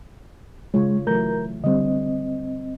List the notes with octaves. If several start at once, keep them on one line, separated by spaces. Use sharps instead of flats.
C#3 G#3 F4 C#5
E3 F#3 A3 A#4 A#5 G6
D3 G3 C4 D#5